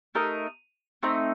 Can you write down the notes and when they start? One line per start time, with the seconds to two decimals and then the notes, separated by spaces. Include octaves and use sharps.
0.15 A3 D#4 A#4 D#5
1.03 A3 C4 D#4